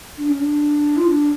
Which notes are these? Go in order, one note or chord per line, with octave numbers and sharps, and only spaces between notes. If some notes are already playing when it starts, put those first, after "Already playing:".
D4
C#4
D4
F4
D4